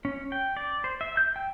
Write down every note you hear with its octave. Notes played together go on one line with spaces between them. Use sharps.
C#4
G5
D5
C5
E5
G6
G5